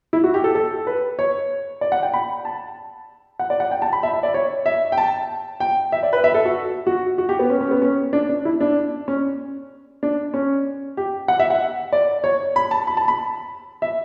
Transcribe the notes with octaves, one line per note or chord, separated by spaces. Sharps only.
E4
F#4
G4
A4
A4
B4
C#5
D5
F#5
G5
B5
A5
F#5
D5
F#5
G5
A5
B5
E5
E5
D5
C#5
E5
G5
A5
G5
E5
D5
B4
E5
A4
F#4
F#4
F#4
G4
B3
C#4
C#4
B3
C#4
D4
D4
E4
D4
C#4
D4
C#4
G4
F#5
E5
F#5
D5
C#5
B5
A5
B5
A5
B5
E5